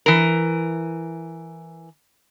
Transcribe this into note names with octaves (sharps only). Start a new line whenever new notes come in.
E3 A#4